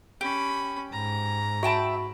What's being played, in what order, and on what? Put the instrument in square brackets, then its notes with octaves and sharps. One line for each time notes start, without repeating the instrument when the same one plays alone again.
[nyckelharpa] C#4 B5 [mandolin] G4
[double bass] G#2 [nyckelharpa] A#5
[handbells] F#4 B5 [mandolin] E5 G5 A5